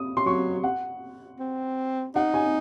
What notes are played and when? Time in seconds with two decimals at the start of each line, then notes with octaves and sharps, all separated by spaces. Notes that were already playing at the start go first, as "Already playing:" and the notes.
Already playing: D#6
0.17 C6
0.26 F#3 C#6
0.64 F#5
1.39 C4
2.15 D#4 F#5
2.34 G#5